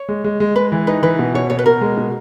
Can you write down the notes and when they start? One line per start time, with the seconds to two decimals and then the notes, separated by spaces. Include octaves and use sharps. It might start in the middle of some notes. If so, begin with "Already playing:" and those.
Already playing: C#5
0.09 G#3
0.24 G#3
0.40 G#3
0.56 G#3 B4
0.72 E3
0.87 D#4 B4
1.03 E3 B4
1.19 B2
1.34 B2 C#5
1.50 B2 C#5
1.59 B4
1.66 B2 A#4
1.81 G#3
1.97 B2